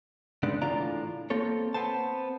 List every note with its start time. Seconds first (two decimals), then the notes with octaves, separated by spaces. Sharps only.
0.43 C#3 G#3 B3 D4
0.62 A2 E3 D4 F4 D5 A#5
1.30 A#3 C4 A4 C#5
1.74 B3 C4 C5 A5